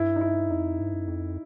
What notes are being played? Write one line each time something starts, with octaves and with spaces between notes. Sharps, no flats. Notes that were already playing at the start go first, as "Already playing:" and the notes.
Already playing: G2 E4
D#4
E4
F2 D#4
G2
F#2
F2